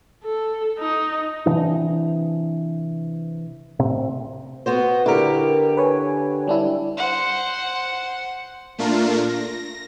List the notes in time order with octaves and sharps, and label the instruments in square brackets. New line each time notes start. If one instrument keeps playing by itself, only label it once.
[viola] A4
D#4
[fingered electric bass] C3 E3 D4
A2 C3 C4
[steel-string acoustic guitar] B3 F#4 C5
[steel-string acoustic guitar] D3 G4 [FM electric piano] E4 A#4
[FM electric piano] B4 C#5 G#5
G3 D4 E4
[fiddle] C5 F#5
[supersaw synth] A#2 A3 D4 F4 A#4
A#6